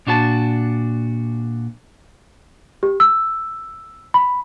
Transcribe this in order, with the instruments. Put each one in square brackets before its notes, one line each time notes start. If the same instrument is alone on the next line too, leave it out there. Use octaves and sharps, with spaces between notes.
[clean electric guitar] A#2 D4 F#4 A#4 A5
[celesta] G4
E6
B5